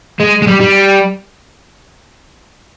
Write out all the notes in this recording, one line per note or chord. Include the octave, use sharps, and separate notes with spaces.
G#3
G#3
G3
G3